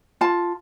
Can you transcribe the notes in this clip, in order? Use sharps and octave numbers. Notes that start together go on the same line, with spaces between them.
F4 A5